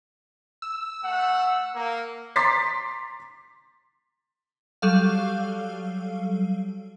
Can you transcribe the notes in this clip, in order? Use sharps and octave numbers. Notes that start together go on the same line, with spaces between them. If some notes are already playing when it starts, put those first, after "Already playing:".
E6
A3 F#5
A#3
A#5 C6 D6 A6 B6 C7
F#3 G3 A4 F5